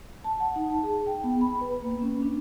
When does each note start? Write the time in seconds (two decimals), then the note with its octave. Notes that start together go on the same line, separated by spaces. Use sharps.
0.24 A5
0.40 F#5
0.56 D#4
0.70 A5
0.83 G#4
1.06 G5
1.24 B3
1.41 B5
1.61 B4
1.82 A#3
2.02 C#4
2.22 D4